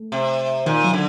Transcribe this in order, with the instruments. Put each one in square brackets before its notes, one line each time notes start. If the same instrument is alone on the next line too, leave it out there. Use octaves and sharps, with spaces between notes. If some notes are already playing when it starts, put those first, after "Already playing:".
Already playing: [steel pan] A3
[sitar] C3
[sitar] A#2 [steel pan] D#3
[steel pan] F#3
[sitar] D3